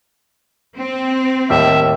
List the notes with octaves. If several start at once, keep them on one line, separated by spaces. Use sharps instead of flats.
C4
D#2 A2 G3 E5